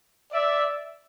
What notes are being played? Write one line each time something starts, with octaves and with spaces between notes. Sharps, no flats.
D5 E5